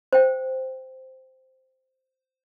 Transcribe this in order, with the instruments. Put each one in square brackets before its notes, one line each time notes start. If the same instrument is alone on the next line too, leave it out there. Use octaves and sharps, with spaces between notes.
[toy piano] C5 G5